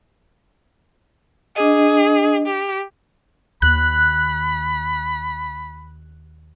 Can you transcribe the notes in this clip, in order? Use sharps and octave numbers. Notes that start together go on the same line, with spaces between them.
D4 G#4 D#5
G4
D#2 B5 F#6